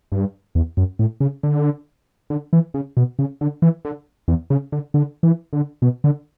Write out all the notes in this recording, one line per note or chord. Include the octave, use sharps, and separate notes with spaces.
G2
E2
F#2
A2
C#3
D3
D3
E3
C#3
B2
C#3
D3
E3
D3
E2
C#3
D3
D3
E3
D3
B2
D3